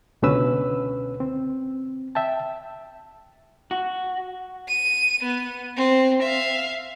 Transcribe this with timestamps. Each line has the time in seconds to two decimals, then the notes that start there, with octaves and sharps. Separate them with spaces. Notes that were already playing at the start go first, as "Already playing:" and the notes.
0.22 C#2 B2 D3 C#4 B4 E6
1.20 C4
2.15 E5 G5 A5
3.71 F#4
4.68 D#7
5.23 B3
5.77 C4
6.22 E5 F5